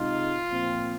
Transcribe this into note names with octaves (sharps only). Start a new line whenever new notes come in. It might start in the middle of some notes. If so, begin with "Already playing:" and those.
Already playing: C3 G#3 D#4 F4
A#2 F3 C4